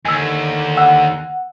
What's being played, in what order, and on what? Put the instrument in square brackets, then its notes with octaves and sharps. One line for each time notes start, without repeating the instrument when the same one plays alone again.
[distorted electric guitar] D#2 [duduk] D3 [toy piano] G#5 E6
[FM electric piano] F#5 [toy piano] E6